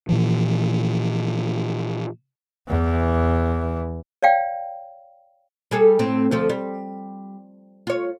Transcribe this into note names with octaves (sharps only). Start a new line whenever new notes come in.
A#2 E3 F3
E2 E3
C#5 D5 F5 G5
G3 G#4 A4
A2 C4
D2 F3 A4
G3
F4 C#5